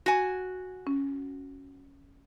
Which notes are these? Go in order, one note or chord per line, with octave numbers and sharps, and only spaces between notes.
F#4 G#5
C#4